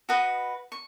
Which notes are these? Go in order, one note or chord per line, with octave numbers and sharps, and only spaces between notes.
F#4 B4 D#5 D#6
C#6